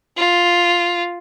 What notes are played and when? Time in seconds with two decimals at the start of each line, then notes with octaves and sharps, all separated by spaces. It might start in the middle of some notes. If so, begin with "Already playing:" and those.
0.17 F4